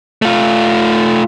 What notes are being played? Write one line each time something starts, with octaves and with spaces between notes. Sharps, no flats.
A3 F4